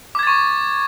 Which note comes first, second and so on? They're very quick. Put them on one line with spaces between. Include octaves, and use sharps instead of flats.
D6 G#6 A6 C#6